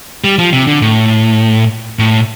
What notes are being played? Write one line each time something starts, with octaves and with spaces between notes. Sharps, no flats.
G3
F3
C3
D3
A2
A2